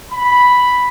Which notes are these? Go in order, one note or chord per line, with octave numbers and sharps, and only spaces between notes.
B5